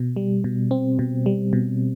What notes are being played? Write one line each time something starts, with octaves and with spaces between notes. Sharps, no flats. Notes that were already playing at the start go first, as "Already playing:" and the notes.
Already playing: B2
G3
B2
C4
B2
G3
B2